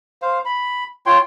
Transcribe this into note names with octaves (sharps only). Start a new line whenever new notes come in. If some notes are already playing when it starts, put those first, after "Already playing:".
C5 F5
B5
F4 C#5 G5 C6